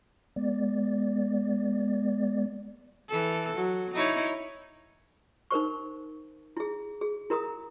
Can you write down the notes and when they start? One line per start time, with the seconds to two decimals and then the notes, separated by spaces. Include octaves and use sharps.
0.36 G#3 B3 D5
3.09 E3 A4
3.56 F#3
3.94 D#4 E4 C#5
5.51 D#4 A#4 C5 C#6
6.57 E4 G#4
7.01 G#4
7.30 E4 A#4 A#5 D#6